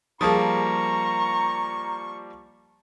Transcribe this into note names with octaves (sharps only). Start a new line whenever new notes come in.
F3 G3 A#3 G#4 A5 A#5 C#6 D#6